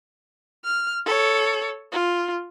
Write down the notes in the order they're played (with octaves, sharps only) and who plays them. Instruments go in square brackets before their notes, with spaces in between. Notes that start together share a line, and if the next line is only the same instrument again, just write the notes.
[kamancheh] F6
A4 C#5
F4